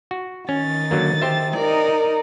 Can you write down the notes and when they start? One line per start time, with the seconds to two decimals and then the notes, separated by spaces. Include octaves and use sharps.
0.11 F#4
0.49 D#3 C#4 A6
0.91 D3 F#3 A#3
1.22 G4 C5 E5
1.56 D#4 A#4 D5